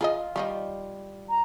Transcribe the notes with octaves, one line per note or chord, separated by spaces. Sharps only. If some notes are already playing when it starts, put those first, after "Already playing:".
F4 G#4 B4 D#5
D#3 F3 G3 D#5
A#5